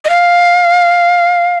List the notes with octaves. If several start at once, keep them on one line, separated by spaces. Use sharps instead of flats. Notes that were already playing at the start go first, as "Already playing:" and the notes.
D#5
F5